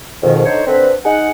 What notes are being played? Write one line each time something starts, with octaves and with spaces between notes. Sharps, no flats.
F2 G#2 B2 D#3
D3 D#4 C5 C#5
D3 C4 B4
D#4 G#4 F#5